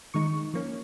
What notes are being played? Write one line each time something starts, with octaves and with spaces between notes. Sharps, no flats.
D#3 G#3 D#4 C#6
F3 A#3 C#4